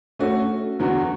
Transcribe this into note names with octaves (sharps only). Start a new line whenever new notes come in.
A3 C#4 F#4 A4
E2 D3 F#3 B3 F#4